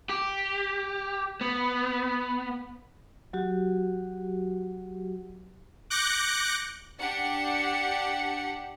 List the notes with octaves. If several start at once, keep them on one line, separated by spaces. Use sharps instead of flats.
G4
B3
F#3 F#4 G4
D6 F#6 G6 A#6 C#7
D4 G4 F#5 C#7